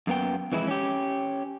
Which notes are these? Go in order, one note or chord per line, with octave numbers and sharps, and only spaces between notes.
F#2 A#3 B3 G5
F2 E3 G#3 E4
C#4 G4